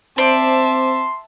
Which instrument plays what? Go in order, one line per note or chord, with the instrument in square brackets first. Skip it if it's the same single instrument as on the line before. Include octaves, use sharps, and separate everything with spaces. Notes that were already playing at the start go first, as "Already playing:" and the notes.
[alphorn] C4 [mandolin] C5 D5 [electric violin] E5 A5 [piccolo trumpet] C6